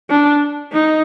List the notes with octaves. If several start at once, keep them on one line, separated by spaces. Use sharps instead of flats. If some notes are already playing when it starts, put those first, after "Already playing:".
D4
D#4